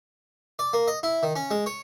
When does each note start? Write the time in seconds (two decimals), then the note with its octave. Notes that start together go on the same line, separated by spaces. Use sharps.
0.59 D5
0.73 A#3
0.88 D#5
1.03 E4
1.23 D#3
1.36 C#4
1.51 G#3
1.66 C#5